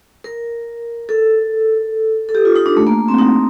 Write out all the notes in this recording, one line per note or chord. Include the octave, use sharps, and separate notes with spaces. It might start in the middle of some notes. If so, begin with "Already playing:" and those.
A#4
A4
A4
G4
F4
D#4
D4
A3
A#3
C4
D#4